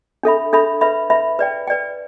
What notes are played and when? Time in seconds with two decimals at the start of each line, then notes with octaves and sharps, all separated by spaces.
0.23 D4 A4 E5 B5
0.53 D4 A4 E5 B5
0.81 B4 E5 B5
1.10 B4 E5 B5
1.39 B4 D5 G5
1.67 B4 D5 G5